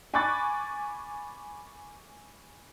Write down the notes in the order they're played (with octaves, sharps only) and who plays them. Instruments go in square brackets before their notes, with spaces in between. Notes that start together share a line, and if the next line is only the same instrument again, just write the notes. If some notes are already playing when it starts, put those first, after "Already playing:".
[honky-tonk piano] G#5 B5 C#6 D6 F#6 A6